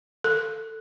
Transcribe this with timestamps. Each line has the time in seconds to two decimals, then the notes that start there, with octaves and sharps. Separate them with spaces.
0.24 A4